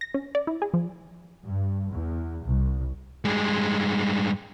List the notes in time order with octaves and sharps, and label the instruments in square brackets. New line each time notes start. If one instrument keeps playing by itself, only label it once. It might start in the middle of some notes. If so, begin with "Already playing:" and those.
[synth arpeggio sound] A#6
C#4
D5
E4
G#4
F3
[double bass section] G2
E2
C2
[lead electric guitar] G2 G#3